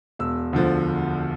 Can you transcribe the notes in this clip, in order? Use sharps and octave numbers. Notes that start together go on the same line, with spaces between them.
E1 E6
D2 D3 F3